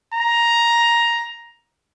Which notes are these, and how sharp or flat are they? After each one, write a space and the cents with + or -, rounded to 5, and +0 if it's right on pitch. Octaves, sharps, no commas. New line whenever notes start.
A#5 +10